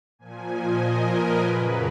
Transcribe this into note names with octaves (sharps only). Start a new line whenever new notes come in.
A#2 F3 G#5
D#5
A#4
B4
F#2 C#3 F#3 B4